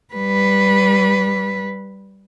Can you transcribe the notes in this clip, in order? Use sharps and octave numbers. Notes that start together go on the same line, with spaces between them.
G3 B4